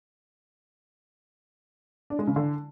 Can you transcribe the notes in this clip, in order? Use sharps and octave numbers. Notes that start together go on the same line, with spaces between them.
D4
G#3
C#3
D3